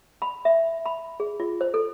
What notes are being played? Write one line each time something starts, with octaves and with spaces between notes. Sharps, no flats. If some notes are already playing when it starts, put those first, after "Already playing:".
B5
E5
B5
G#4
F4
C5
A4